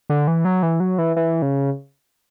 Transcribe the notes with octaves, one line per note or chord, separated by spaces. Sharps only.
D3
E3
F#3
E3
F#3
E3
E3
C#3